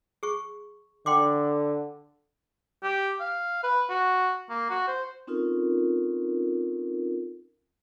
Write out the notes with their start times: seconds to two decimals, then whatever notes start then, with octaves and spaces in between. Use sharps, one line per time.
0.23 G#4 C#6
1.06 D3 G5 C6 D6
2.83 G4
3.20 F5
3.63 B4
3.90 F#4
4.50 A#3
4.70 F#4
4.88 C5
5.27 C4 C#4 D#4 F4 A4 A#4